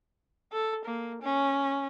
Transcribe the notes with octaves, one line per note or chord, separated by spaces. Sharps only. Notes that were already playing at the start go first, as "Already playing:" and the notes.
A4
A#3
C#4